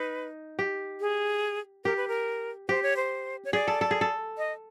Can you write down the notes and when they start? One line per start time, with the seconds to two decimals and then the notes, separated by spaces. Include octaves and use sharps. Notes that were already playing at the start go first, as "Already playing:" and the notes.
Already playing: D#4 B4
0.59 G4
1.01 G#4
1.85 G4 A#4
1.97 B4
2.08 A#4
2.69 G4 C5
2.83 C#5
2.97 C5
3.45 C#5
3.53 G#4 D5
3.68 A4
3.81 A4
3.91 G#4
4.01 A4
4.38 D#5